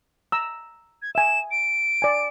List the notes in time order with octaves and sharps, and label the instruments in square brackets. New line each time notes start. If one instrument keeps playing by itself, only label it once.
[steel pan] A#5 E6
[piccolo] G#6
[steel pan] E5 G#5 [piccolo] E7
[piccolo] D7
[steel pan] D5 G#5